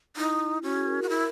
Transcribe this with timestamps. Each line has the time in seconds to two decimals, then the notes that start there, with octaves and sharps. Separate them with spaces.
0.17 D#4 E4
0.63 C#4 F#4
0.74 G#4
0.86 A#4
0.98 A#4
1.02 F#4
1.09 E4 A#4